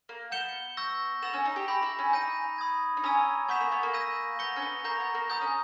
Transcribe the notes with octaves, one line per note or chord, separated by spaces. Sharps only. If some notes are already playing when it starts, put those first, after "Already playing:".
A#3
B3 G6 C#7 E7 G7
C#6 E6 G6 A#6
B3 E6 A#6 E7
C#4
D#4
G4
G4 B5 G6 A#6
E4
C#4
D#4 G6 A#6 D#7
B5 D#6 G#6
D#4
C#4 A#5 C#6 E6 G#6 D#7
B3 G#5 C#6 G6 B6 E7
A#3
B3
A#3
E6 G6 A#6 D#7
B3 G6 A#6 C#7 G7
C#4
B3
A#3 A#5 C#6 G6 A#6
B3
A#3
B3 A#5 D#6 G6
C#4